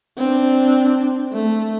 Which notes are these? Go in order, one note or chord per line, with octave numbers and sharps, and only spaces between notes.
C4 D4
A3